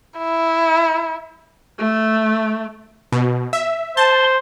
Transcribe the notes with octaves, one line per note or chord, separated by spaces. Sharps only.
E4
A3
B2
E5
C5 A5 C6